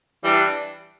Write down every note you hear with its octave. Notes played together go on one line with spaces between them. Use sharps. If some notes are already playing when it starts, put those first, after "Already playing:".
E3 G3 D4